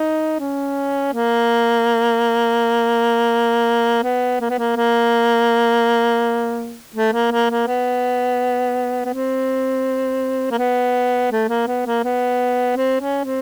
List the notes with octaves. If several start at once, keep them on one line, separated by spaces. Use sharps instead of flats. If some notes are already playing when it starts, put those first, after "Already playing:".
Already playing: D#4
C#4
A#3
B3
A#3
B3
A#3
A#3
A3
A#3
A#3
A#3
B3
B3
C4
A#3
B3
A3
A#3
B3
A#3
B3
C4
C#4
C4